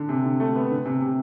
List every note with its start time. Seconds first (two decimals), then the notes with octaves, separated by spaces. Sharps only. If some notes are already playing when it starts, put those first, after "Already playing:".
Already playing: D3
0.09 C3
0.24 D3
0.40 A3
0.56 B3
0.70 D3
0.85 C3
1.01 C3